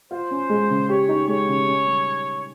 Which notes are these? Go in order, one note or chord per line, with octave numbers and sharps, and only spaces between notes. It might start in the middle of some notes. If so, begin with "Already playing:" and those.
F4 C5
C#4
G#3
C#3
G4 C#5
D#4
G#3 C#5
C#3
C#4
G3